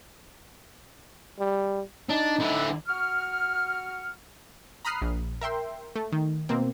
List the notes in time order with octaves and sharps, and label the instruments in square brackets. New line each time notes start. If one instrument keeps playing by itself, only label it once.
[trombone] G3
[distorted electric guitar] D4 [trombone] D#4
[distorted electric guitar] D3 E4
[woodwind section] F#4 C#6 F6
[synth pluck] A#5 B5 D#6 F6 F#6 C7
A#1
A#4 E5 G5 C6
A3
D#3
B2 A#3 C4